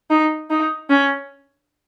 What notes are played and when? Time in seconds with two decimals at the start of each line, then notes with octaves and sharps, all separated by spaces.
0.10 D#4
0.50 D#4
0.90 C#4